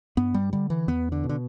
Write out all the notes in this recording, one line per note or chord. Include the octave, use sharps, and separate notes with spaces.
G2 B3
G3
D3 G3
E3
E2 B3
D3
B2
D3